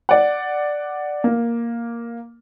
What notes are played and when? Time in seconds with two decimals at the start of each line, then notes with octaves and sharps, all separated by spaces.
0.09 D5 F#5
1.24 A#3